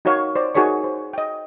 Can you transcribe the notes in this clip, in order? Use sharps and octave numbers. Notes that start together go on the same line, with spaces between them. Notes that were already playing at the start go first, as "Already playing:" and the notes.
D#4 F#4 A#4 C#5 F5
C5 D5
D#4 F#4 G#4 A#4 C#5 C#6
C5
D#5 G5